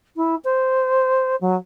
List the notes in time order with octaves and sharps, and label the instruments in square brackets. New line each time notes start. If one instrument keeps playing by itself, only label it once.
[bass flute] E4
C5
F#3